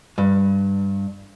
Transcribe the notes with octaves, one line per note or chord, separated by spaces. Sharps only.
G2